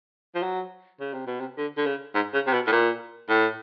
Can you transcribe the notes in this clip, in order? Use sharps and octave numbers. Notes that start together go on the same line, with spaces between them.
F3
F#3
C#3
C3
B2
C3
D3
D3
C#3
G#2
C#3
C3
B2
A2
A#2
A2